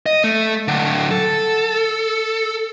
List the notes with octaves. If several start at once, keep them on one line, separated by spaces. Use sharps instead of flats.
D#5
A3
D3 F#3
A4